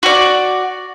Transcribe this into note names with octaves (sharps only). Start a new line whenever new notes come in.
F#4 D5